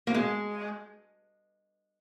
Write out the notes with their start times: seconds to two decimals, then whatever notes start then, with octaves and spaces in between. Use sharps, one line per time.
0.07 A#3
0.14 G#3